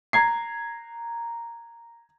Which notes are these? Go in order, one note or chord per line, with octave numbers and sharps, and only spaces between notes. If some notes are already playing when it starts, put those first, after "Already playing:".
A#5 G#6 C7